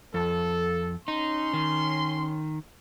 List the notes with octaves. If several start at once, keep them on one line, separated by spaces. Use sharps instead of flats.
F2 A4
C#4 D#4 C6
D#3